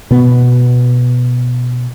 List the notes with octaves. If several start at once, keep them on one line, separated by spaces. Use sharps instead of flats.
B2 B3